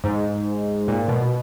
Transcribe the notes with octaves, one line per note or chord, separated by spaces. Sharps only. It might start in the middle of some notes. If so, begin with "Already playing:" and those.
G#2
A#2
B2